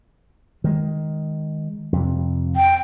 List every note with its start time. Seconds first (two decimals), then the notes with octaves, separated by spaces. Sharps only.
0.64 D#3 G#3
1.92 F2 C3
2.56 G5